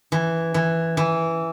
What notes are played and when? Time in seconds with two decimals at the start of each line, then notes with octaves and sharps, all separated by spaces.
0.12 E3
0.54 E3
0.97 E3